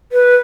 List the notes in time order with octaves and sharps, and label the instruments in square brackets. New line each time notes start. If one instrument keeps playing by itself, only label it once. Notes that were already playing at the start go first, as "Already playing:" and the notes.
[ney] B4